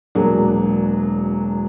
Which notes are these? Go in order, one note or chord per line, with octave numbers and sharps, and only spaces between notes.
E1 F#3 A#3 D4 G#4